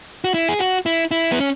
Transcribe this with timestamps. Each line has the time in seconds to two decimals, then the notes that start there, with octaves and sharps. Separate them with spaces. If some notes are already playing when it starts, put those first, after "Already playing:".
0.24 F#4
0.34 E4
0.49 G#4
0.59 F#4
0.86 E4
1.11 E4
1.32 B3
1.40 C#4